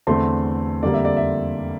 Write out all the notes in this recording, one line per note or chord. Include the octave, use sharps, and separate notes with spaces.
E2 D3 A3 C4 A5 C6
F2 D3 G3 A#3 D5
E5
D5
E5